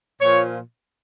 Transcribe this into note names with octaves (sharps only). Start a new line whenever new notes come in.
A#2 F3 C#5